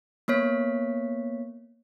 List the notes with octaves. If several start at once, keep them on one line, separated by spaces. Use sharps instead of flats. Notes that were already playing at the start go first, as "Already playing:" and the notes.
A#3 B3 C#5 B6